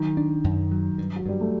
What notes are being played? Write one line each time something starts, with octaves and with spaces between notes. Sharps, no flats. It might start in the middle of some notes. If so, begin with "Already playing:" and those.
Already playing: D#3 F#3
D4
F#2
F#3
G2
F#3
G2 G3
A3